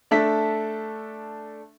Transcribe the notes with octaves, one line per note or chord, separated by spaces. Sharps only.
A3 D4 A4 E5 B6